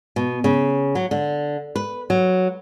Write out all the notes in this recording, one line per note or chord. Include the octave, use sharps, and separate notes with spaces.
B2
C#3
F#3
D3
B4
F#3